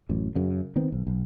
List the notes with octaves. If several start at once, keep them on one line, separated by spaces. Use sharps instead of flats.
A1 F#2
F#2 C#3
D#3 B3 C4
B1
B1